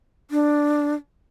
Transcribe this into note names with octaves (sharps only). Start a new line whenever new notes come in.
D4